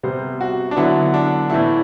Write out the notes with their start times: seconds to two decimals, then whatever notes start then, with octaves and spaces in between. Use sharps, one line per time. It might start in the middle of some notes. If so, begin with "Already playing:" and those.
0.03 C3 G3 B3 C5
0.41 F#4
0.71 D4
0.76 D3 F#3 B3 E4
1.14 D4
1.50 A2 E3 A3 E4